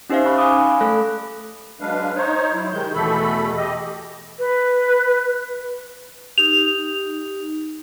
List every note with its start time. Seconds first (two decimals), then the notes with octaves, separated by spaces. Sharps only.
0.10 C#4 D#4 G4 C5 E5 F5
0.26 B5 C#6 F#6
0.38 F5 G#5 B5 D6 D#6
0.81 A3 A4 B5 F#6
1.81 F#3 G#3 D4 B4 F5
2.16 D#4 C5 C#5
2.53 F#3 E4
2.72 C3 D#3 G#3 G6
2.95 E2 B2 E3 A3 A4 B5
3.57 G4 D#5
4.38 B4
6.38 D#4 G4 F7